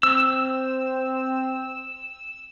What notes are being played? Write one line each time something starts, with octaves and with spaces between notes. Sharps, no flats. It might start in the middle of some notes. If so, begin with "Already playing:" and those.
C4 E6